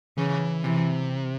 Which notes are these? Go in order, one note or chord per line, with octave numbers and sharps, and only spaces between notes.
C#3 E3
C3 E3